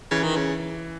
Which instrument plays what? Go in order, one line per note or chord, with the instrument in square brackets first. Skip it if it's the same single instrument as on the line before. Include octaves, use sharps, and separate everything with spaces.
[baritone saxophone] C#3 [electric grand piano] E3
[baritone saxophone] D#3
C#3